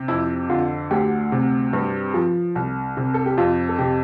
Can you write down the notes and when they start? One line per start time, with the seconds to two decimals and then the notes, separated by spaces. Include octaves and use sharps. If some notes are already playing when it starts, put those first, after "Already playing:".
Already playing: C3
0.08 F2 E4
0.50 D3 F4
0.91 D2 G4
1.32 C3
1.73 G2
2.14 F3
2.55 C2
2.97 C3
3.14 A4
3.26 G4
3.37 F2 F4
3.69 A4
3.78 C3 G4